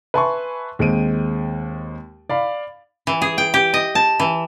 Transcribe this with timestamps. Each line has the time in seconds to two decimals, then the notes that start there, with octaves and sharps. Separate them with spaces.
0.14 B4 E5 G#5 A5 C6 C#6
0.79 D#2 G#3 C4 D7 D#7
2.29 D5 F5 B5
3.07 E3
3.22 G#4
3.38 G5
3.54 G4
3.74 D#5
3.95 A5
4.20 E3